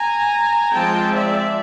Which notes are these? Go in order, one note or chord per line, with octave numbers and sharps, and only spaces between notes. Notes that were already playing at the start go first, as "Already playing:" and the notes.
Already playing: G#5 A#5
F3 G#3 C4 G5 A5
D5 E5